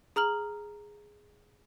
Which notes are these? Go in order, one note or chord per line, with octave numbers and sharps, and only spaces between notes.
G#4 A#5 F6 F#7